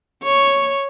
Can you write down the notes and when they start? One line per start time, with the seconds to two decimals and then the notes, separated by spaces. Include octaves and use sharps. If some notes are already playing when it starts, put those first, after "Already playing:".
0.23 C#5